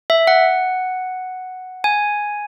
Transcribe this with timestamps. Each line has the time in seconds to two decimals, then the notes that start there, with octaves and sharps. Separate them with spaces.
0.10 E5
0.27 F#5
1.84 G#5